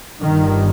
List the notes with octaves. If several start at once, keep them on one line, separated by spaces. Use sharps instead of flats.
G1 G2 D#3